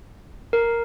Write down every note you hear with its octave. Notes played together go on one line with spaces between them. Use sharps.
A#4